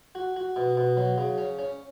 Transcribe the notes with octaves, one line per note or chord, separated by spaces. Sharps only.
F#4
F#4
B2
B2
F#3
C#3
C#4
C#4